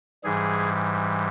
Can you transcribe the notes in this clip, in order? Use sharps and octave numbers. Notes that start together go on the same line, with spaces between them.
G#2 E3 G3 G#4